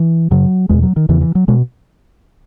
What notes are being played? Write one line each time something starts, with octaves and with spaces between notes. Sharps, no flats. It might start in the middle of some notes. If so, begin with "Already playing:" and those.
Already playing: E3
F#2 C#3 F#3
E2 B2 G#3
F#3
D#3
E2 C#3 E3
E3
F#3
B2 G#3